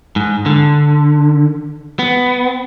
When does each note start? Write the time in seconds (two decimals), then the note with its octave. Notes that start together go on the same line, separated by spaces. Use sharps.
0.16 G#2
0.46 D3
1.99 B3